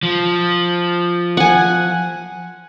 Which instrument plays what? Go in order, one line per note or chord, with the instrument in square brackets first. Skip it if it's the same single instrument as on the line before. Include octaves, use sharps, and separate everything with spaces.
[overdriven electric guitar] F3
[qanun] F#5 G#5